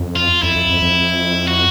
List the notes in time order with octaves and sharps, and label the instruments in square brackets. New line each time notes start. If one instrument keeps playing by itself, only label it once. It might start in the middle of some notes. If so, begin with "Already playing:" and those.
Already playing: [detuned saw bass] F2
[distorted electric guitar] F4
[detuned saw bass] F2 [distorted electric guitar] E4
[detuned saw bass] F2
F2
F2
[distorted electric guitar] F#4